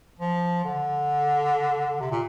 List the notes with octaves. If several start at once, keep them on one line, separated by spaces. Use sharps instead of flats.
F3
D3
C3
A#2